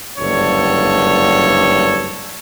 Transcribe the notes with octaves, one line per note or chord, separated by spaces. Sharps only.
F#1 D2 G2 A4 C#5